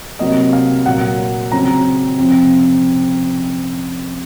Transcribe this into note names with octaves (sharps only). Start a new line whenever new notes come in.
C3 F#3 A#3 D#5
F5
A#2 F#3 A#3 F#5
C#3 F#3 C4 A#5
C3 F3 C4